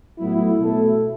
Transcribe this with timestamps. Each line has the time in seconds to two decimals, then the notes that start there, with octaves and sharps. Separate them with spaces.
0.19 A2 F#3 B3 E4
0.59 B2 A3 E4 A4